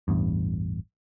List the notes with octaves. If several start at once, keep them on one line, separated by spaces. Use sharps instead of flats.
A1 E2 G2